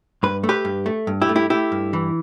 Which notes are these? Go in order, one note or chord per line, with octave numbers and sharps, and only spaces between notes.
G2 B4
A3
G4 B4
G2
A3
G2
E4 G4
A3
E4 G4
A3 E4 G4
G2
E3